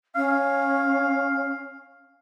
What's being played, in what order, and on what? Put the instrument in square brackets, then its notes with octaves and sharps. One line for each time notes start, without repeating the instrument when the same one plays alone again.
[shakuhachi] C#4 [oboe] F5